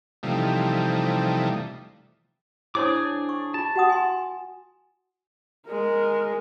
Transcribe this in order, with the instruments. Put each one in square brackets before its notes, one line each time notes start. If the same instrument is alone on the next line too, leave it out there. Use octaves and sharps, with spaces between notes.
[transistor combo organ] C3 E3 F3 G3 A3 D#4
[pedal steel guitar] D4 G#4 D6 [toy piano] E4 C5 C#5
[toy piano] C#6
[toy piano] F4 [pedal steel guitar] A5
[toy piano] F#4 F#5 D#6
G#5 C6
[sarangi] G#3 [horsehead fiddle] A#4